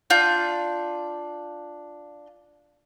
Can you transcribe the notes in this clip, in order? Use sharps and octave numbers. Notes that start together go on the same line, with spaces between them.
D4 F4 G6